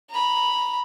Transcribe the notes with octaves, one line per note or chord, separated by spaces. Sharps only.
A#5 B5